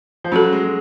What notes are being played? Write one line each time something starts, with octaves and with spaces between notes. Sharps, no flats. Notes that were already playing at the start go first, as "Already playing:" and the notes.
F3
F#3 C#4 F#4 A4
G#3
G#3